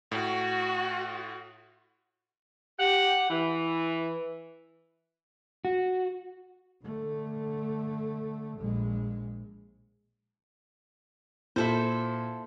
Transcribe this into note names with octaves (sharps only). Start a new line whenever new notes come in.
A2 F#4
G4 F#5
E3
F#4
D3 A3
A#1 G#3
A#2 E4 A4 C5